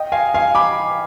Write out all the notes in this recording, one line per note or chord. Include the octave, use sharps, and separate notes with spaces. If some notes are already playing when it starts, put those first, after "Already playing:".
Already playing: D#5 G5
F5 G#5
F5 G#5
B5 D6